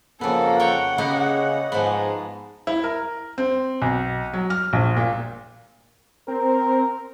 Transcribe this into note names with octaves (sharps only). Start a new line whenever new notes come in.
F2 C#3 A#3 B3 A4
C#5 F#5 G5
C#3 A#3 B3 G4 D#5
G#2 F3 B3
E4
A#4
C4
B1
F#3
F6
A#1
A#2
C4 A#4